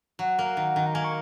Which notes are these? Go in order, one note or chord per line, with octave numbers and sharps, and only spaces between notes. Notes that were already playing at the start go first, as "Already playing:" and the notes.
F#3 F#5
A#3
D#3
D#3
A#5
A#3 G#5
C#6